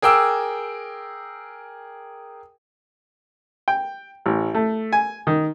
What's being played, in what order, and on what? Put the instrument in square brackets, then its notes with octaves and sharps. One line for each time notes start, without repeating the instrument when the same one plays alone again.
[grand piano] G#4 A#4 G5 D6 E6
[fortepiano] G5
A1
A3
G#5
D#3